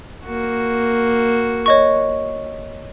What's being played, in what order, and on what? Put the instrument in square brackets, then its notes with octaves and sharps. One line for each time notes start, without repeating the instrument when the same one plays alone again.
[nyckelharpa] A#3 F#4
[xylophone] C#5 D#5 C#6